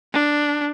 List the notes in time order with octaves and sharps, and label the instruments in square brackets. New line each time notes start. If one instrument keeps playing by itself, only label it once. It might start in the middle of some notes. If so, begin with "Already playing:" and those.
[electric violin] D4